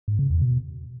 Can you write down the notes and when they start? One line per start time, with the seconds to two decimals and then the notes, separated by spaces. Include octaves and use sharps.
0.08 G#2
0.19 C#3
0.30 E2
0.41 B2